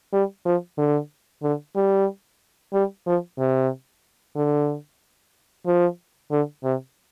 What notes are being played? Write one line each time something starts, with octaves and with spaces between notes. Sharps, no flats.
G3
F3
D3
D3
G3
G3
F3
C3
D3
F3
D3
C3